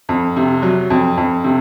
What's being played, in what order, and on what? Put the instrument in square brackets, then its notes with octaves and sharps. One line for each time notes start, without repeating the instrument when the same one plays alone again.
[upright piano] F2
C3
F#3
F2
F2
C3